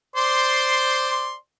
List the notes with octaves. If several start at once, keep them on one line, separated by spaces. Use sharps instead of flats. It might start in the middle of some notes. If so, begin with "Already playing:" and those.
C5 D5 C6